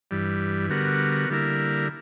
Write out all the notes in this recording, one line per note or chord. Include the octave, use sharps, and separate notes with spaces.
G2 E3 G3
D3 G3 B3 F#4 A#4
D3 G3 A#3 E4 A#4